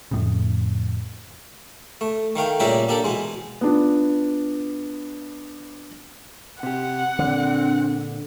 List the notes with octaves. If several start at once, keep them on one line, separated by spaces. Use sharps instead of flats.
F2 A2 C#3
A3
D#3 A3 F5 G5
A#2 C#3 G3 G4 A#4 E5
A#3 D4 G4 A4
B2 E3 G#3
B3 D4 F4
C3 G4 F#5
A#2 D3 C4 D4